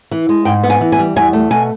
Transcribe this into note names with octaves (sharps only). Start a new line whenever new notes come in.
E3
G#3
G#2 G5
B3
G#5
E3
G#5
G3
E2 G#5
A3
B2 G#5